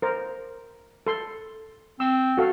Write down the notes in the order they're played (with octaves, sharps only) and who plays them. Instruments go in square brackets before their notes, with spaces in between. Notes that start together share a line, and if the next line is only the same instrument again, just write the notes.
[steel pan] A#4 C5
A4 C6
[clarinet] C4 [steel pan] E6
[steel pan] F#4 A4 F5